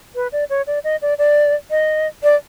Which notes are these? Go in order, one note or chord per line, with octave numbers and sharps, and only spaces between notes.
B4
D5
C#5
D5
D#5
D5
D5
D#5
D5